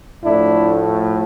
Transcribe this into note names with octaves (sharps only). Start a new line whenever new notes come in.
A2 F3 A3 D4 E4